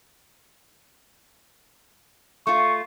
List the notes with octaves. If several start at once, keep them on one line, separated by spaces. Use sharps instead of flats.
A3 F4 C#6